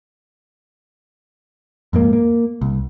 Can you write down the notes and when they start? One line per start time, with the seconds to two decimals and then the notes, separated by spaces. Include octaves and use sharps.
1.93 F2 G#2 A#3
2.13 A#3
2.61 C2